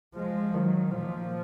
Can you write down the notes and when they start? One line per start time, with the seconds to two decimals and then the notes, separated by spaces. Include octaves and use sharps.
0.15 F3 G#3
0.53 D#3 F#3
0.91 A#2 F3